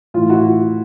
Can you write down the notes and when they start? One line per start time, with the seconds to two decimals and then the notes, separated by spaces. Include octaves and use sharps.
0.14 A2 E3 F4
0.30 E4 F#4
0.45 F4